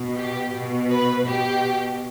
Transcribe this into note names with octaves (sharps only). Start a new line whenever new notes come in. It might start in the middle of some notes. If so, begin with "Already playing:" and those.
Already playing: B2
G4
B2
B4
B2 G4